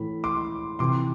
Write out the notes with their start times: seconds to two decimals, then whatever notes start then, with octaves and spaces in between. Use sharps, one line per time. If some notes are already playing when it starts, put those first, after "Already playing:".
Already playing: A2 E3 B5
0.24 C6 D6
0.79 C3 E3 C6 D6